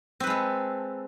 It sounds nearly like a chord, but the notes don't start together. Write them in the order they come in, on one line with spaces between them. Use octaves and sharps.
C4 B4 G#3 A4